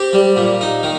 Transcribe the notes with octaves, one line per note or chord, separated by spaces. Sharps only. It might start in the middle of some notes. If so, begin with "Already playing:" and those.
Already playing: C4 G4
G3
A#2
D#4
D#3